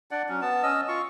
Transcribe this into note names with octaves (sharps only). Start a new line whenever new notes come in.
D4 D5 F#5
F#3 C#4
B3 A5
C#4 D#5 E6
F4 C#6